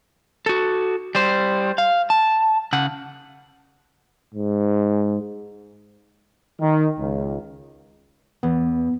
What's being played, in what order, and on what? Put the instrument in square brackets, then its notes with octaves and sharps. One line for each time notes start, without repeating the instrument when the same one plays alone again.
[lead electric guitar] F#4 A4
G3 C5
F5
A5
C#3 F#5
[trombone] G#2
[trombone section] D#3
C#2
[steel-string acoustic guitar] E2 [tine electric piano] B3